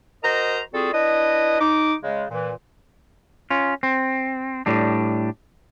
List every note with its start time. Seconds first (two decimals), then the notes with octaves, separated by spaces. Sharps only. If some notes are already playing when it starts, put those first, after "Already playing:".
0.24 F#4 A#4 C5 D#5 A#5
0.73 G3 C4 F4 F#4 G#4 A4
0.93 D4 E4 B4 D#5
1.60 D#4 D6
2.03 C#3 G#3
2.30 A#2 E3
3.50 C#4 F4
3.83 C4
4.66 A2 G3 D4